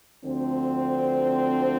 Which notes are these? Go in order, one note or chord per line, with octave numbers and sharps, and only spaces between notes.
D2 D3 F3 C4